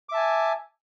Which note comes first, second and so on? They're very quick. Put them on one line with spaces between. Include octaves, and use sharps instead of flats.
D6 E5 A5 G#5